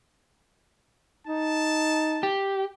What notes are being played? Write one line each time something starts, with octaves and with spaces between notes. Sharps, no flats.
D#4 A5
G4